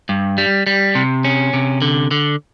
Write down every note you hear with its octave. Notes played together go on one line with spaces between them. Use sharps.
G2
G3
G3
C3
C#4
C3
D3
D3